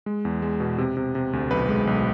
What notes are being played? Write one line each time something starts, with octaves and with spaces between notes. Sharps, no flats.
G#3
E2
G#3
B2
C3
C3
C3
D2
B1 B4
G#3
B1